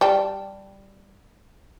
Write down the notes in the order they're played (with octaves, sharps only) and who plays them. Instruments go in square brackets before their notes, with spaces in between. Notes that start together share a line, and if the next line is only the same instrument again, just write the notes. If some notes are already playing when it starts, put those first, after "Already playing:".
[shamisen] G3 G5 A5